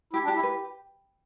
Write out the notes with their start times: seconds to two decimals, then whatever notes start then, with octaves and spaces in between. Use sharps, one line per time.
0.13 E4 G4
0.24 D4
0.28 G4
0.35 E4
0.43 B4